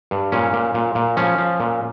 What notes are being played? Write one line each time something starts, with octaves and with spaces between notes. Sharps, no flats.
G2
A#2 C#4
A#2
A#2
A#2
F3 C#4
F3
A#2